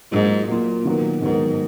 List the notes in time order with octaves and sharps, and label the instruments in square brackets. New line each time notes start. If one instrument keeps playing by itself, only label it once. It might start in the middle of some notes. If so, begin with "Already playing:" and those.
[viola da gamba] G#2 [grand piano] F#3 A#3 F4
[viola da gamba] A#2 [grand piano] F#3 A#3 F4
[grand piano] D#3 F#3 B3 F#4 A#4
[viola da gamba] G#2 [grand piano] D#3 F#3 B3 F#4 A#4